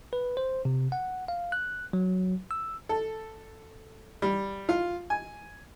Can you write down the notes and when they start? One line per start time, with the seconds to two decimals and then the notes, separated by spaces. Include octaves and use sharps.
0.13 B4
0.37 C5
0.65 C3
0.92 F#5
1.28 F5
1.52 F#6
1.93 F#3
2.51 E6
2.89 A4
4.22 G3
4.69 F4
5.10 G#5